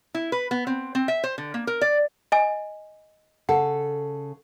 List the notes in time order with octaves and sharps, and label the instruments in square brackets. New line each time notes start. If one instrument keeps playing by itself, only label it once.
[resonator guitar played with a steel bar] E4
B4
B3
C4
C4
E5
C5
D3
A#3
A#4
D5
[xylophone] D#5 G#5
[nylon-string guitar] C#3 A4 [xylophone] F#5